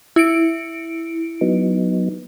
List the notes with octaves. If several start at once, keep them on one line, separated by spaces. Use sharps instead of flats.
E4 C#7 D7
F#3 B3 D#4